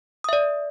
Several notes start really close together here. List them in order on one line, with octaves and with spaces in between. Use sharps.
D#6 E5 D5